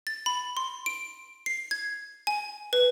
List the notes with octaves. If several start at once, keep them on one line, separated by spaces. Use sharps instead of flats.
A6
B5
C6
D7
C7
G#6
G#5
B4